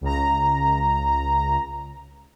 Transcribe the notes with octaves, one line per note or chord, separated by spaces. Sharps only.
C#2 A#5